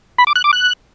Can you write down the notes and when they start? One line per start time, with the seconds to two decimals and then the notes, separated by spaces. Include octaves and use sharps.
0.18 B5
0.27 D6
0.36 F#6
0.44 D6
0.53 F#6